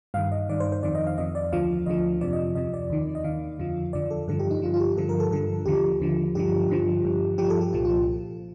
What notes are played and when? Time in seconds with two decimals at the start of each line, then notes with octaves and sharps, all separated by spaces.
0.14 G2 D#3 F5
0.32 D#5
0.49 G2 D#3 D5
0.60 C5
0.72 C5
0.83 F2 D#3 D5
0.95 D#5
1.07 F5
1.18 F2 D#3 D#5
1.35 D5
1.53 D2 D3 F3 F5
1.86 D2 D3 F3 D#5
2.21 F2 C3 F3 D5
2.33 D#5
2.55 F2 C3 F3 D#5
2.74 D5
2.90 D#2 D#3
3.15 D#5
3.24 D#2 D#3 F5
3.59 F2 D3 F3
3.93 F2 D3 F3 D5
4.11 A4
4.28 G2 D3 F3 A4
4.40 G4
4.51 D#4
4.62 G2 D3 F3 F4
4.74 F4
4.80 G4
4.97 G2 D3 F3 A4
5.09 A#4
5.20 A4
5.31 G2 D3 F3 A4
5.66 D#2 D3 F3 G4
6.00 D#2 D3 F3
6.35 G2 D3 F3 G4
6.69 G2 D3 F3
7.05 G2 F3
7.38 G2 F3 G4
7.50 A4
7.61 G4
7.73 C2 A#2 F3 F4
7.85 F4